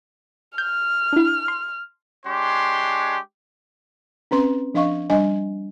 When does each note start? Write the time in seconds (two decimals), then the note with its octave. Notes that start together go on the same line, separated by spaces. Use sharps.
0.58 F6 G6
1.13 D4 E4
1.48 C6
2.26 G#3 D4 G4 C#5 C6
4.31 C4 C#4 B4 C6
4.74 F3 D4 D#5 F5 C#6
5.10 G3 D4 D#5 G#5